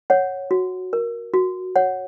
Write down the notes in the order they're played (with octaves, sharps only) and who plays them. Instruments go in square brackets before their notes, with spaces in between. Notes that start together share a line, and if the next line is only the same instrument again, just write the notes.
[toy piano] C#5 F#5
F#4
A#4
F#4
C#5 F#5